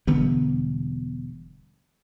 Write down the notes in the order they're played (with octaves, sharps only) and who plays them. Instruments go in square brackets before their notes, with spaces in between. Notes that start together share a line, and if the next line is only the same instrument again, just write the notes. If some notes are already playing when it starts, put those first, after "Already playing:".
[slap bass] E1 D3 G3 B3